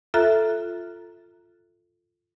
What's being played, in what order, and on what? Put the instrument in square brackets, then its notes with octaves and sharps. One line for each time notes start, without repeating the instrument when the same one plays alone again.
[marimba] F4 A4 E5 A#5 F#6